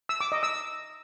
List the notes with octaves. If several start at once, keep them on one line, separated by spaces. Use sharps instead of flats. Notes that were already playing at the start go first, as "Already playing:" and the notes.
E6
D6
D#5
E6